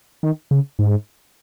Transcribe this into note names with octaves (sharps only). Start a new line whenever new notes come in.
D#3
C#3
G#2